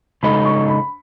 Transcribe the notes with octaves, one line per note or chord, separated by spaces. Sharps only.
C#3 G#3 D#4 A4 D#5 B5
C#6
B5